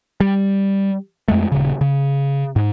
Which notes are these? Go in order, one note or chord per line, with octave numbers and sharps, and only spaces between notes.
G3
F2 G#3 A3
D#1 C#3
C#3
G#2